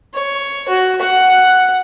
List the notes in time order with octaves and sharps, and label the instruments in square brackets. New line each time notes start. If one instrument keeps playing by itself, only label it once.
[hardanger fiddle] C#5
F#4
F#5